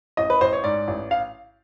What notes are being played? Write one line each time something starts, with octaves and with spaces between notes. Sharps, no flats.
A1 D#5
B4
A1 C5
C#5
G#2 D5
A1
F5